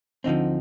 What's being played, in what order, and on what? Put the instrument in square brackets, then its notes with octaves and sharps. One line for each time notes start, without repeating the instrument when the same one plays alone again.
[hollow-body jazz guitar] D2 D3 F3 C4 D#4